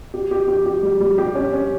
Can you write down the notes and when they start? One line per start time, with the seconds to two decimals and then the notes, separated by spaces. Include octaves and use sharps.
0.14 G4
0.31 G4
0.48 G4
0.66 G4
0.83 G3
1.01 G3
1.18 G4
1.35 C#4
1.53 C#4